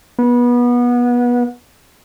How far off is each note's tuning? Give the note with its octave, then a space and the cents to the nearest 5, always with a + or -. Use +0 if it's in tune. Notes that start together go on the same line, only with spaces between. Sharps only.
B3 -25